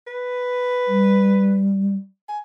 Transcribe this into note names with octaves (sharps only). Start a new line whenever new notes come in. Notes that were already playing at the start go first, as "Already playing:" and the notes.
B4
G3
G#5